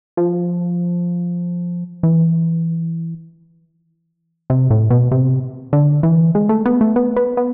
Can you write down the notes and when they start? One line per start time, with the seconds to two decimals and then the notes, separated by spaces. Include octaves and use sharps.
0.17 F3
2.03 E3
4.50 C3
4.70 A2
4.90 B2
5.11 C3
5.73 D3
6.03 E3
6.35 G#3
6.49 A3
6.66 B3
6.81 A3
6.96 B3
7.16 B3
7.37 B3